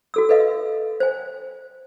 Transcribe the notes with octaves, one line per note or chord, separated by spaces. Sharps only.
F#4 A4 E6
A4 B4 D#5 F5
C5 G#5